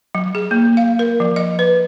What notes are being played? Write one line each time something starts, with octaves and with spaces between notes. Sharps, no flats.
F#3
G#4
A#3
F5
A#4
F3
D#5
B4